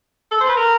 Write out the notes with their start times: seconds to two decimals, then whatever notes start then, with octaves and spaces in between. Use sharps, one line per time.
0.31 A4
0.41 C5
0.49 B4
0.57 A#4